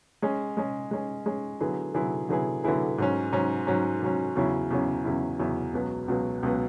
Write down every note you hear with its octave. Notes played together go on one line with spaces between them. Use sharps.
G#3 C#4 G#4
G#3 C#4 G#4
G#3 C#4 G#4
G#3 C#4 G#4
D3 F#3 B3 E4 G#4
D3 F#3 B3 E4 G#4
D3 F#3 B3 E4 G#4
D3 F#3 B3 E4 G#4
G#2 F#3 C#4
G#2 F#3 C#4
G#2 F#3 C#4
G#2 F#3 C#4
E2 C#3 F#3 C#4 E4
E2 C#3 F#3 C#4 E4
E2 C#3 F#3 C#4 E4
E2 C#3 F#3 C#4 E4
C#2 B2 F#3 B3
C#2 B2 F#3 B3
C#2 B2 F#3 B3